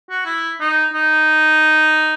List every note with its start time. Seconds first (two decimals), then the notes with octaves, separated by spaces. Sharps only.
0.10 F#4
0.26 E4
0.60 D#4
0.93 D#4